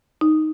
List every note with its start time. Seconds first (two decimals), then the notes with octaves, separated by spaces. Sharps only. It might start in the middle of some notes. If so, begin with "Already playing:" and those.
0.21 D#4